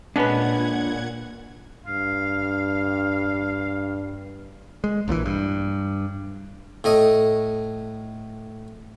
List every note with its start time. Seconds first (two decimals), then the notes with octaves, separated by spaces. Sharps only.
0.16 A#2 G#3 B3 C#4 D4 B4 F#5 G#6
1.86 G2 F5
4.84 G#3
5.08 A#1 A#2 D3 E3
5.26 G2
6.84 A2 A3 D#5